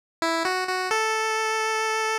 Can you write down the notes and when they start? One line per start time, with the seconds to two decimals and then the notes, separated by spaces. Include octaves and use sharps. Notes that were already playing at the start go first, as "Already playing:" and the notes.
0.22 E4
0.45 F#4
0.68 F#4
0.91 A4